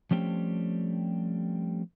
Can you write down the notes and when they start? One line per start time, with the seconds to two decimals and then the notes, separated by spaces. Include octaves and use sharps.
0.11 F3 G3 A3 C4 C#4 G4